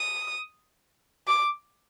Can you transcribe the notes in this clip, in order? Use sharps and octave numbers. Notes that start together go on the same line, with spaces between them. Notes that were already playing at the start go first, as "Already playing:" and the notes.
Already playing: D#6
D6